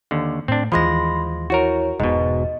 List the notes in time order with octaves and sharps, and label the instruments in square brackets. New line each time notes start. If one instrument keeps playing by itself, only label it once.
[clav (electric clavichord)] D#2 D3
[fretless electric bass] A2 [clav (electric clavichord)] C4 D4
[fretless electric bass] D#2 E3 [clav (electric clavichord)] F3 G#3 [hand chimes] B5 C6 A#6
[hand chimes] E4 C#5 [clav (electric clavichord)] F#4 A#4
[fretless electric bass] E1 [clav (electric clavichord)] G#2 B2 [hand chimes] D#5